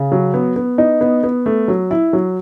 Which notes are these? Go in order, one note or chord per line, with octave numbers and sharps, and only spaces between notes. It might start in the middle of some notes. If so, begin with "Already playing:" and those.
Already playing: C#3
F#3
B3
B3
D#4
B3
B3
A3
F#3
E4
F#3